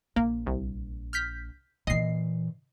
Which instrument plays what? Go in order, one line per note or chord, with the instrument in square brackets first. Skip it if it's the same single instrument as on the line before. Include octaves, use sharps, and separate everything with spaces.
[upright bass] A#1 [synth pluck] A#3
[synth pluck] C2
F6 G6 B6
[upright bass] A#2 E3 [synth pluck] D#5 C7